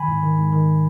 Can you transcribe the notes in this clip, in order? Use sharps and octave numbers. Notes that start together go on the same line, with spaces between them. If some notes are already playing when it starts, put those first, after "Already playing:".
Already playing: D#3 G#5 B5
G#2
D#3
G#2
D#3